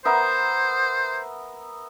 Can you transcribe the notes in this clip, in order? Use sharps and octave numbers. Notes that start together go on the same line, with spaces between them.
B3 A#4 C5 E5